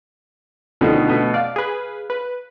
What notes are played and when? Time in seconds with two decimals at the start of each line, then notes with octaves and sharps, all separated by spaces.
0.81 D2 B2 D3 D#3 F3
1.06 B2 A3 B3
1.34 D5 F5
1.56 G#4 B4
2.10 B4